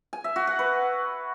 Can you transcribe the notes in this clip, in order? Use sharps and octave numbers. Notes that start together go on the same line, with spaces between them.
G#5
E5
F#4
F#5
B4